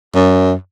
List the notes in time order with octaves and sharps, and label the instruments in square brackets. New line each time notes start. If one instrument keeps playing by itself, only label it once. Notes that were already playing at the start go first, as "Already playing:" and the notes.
[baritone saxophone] F#2